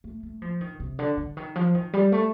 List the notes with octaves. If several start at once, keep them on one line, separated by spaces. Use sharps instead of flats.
A3
A3
F3
D#3
C3
D3
D3
D#3
F3
D#3
G3
A3